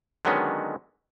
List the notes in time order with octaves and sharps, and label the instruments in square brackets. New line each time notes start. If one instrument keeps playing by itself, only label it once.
[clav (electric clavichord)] D3 D#3 F#3 G#3 B3 C#4